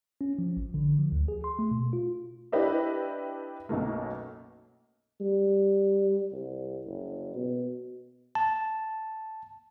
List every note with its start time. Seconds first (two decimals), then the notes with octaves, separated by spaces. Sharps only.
0.21 C#4
0.39 F3
0.57 A1
0.74 D3
0.99 F3
1.12 D2
1.28 G#4
1.44 C6
1.59 A3
1.71 B2
1.93 F4
2.52 D4 E4 G4 B4 D#5 E5
3.69 B1 F#2 B2 A3 A#3
5.21 G3
6.32 C2
6.86 F#1
7.35 B2
8.35 A5